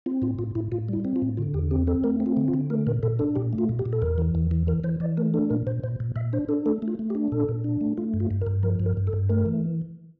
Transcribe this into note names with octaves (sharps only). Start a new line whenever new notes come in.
C4 F4
A2 F4
A2 F4
A2 E4
A2 F4
G3 E4
C4
F4
A2
D3 F4
E2 G4
C4 G4
C4 A4
A3 A#4
C4
F4
D3
F4
D3
A3 A#4
A#2 A#4
A#2 A4
D4 A4
A#2 G4
A3
F4
A#2
G4
A#2
A4
E2 A#4
E3
E2
E3
E3 A#4
E3 C5
E3 D5
A3 A#4
D4 A4
A#2 A#4
A#2 C5
A#2 C5
A#2
A#2 E5
D4 C5
D4 A4
A3 A4
A3
F4
A3
G4
D4
A#2 A4
A#2
D4
A3
A3 F4
G2
F4
G2
A#4
G2
F3 A#4
G2
A#4
G2
A4
G2
A3 A#4
E3